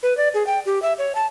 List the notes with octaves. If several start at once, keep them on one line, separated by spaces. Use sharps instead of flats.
B4
D5
G#4
G5
G4
E5
C#5
A5